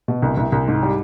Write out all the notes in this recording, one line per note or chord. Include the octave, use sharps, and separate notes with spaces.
B2
C2
C2
C2
G#2
G3